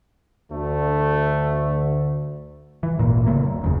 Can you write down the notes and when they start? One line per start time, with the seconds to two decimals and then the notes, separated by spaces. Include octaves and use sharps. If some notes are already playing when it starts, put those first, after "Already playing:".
0.52 D2 A3
2.83 E3
2.97 D1 G#1 A#2 A#3
3.26 C#3 A3 A#3
3.43 F#2
3.62 F1 D#2 C#3